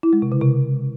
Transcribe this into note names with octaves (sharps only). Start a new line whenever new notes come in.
E4
G#3
C3
C#3
C3